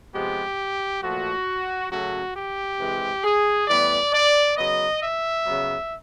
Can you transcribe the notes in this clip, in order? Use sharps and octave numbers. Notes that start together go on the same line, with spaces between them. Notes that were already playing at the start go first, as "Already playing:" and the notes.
C3 F3 G#3 B3 G4
A#2 F3 A3 F#4
C#3 F#3 A3 C#4 F#4
G4
C3 E3 G#3 C4
G#4
A2 E3 G3 B3 D5
D5
C#3 F#3 B3 D#5
E5
C#3 F#3 B3